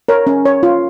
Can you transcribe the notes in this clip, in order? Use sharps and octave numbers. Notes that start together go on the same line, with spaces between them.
A#4 C#5
C#4
C#5
F4